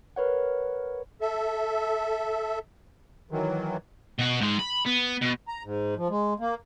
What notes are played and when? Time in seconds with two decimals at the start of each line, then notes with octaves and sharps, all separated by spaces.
0.16 A#4 B4 C#5 F#5
1.21 A4 E5
3.31 D#3 E3 F#3
4.19 B2 F#4
4.41 G#2 G#3
4.59 B5
4.86 B3
5.21 B2
5.48 A#5
5.64 G#2
5.97 F3
6.10 G#3
6.40 A#3